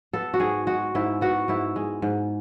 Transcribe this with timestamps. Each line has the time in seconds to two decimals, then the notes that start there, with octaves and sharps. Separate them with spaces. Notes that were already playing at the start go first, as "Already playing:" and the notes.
0.13 B3 A4
0.34 F#4
0.40 G#2 G#4
0.67 G#3 F#4
0.95 G#2 E4
1.21 B3 F#4
1.48 G#2 E4
1.76 G#3
2.02 G#2